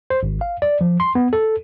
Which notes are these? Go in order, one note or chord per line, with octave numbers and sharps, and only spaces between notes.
C5
G#1
F5
D5
F3
C6
B3
A4